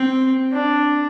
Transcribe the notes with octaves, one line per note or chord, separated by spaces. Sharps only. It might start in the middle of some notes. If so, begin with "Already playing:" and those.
Already playing: C4
D4